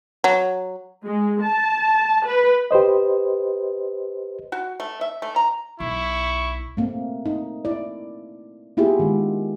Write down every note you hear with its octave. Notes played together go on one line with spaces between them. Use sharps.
F#3
G#3
A5
B4
G4 B4 C5 D#5
F#4
A3
E5
A3
A#5
B1 E4 C#6
A3 A#3 C4
D#4
E4 D5
A#3 B3 E4 F4 G4 G#4
D#3 G#3